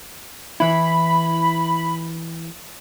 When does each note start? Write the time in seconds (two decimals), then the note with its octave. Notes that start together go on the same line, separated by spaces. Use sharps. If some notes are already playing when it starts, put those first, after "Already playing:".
0.60 E3 E4 B5